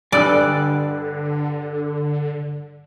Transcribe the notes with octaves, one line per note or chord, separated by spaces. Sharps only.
G2 D3 G3 D5 D#5 G#5 E6 F#6